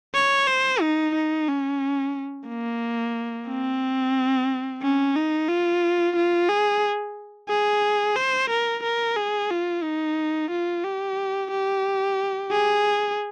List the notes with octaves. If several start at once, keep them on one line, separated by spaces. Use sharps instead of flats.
C#5
C5
D#4
D#4
C#4
A#3
C4
C#4
D#4
F4
F4
G#4
G#4
C5
A#4
A#4
G#4
F4
D#4
F4
G4
G4
G#4